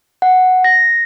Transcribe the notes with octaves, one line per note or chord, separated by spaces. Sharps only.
F#5
A#6